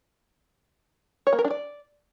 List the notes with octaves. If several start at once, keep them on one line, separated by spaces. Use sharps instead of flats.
C#5
A#3
A#4
D4
D5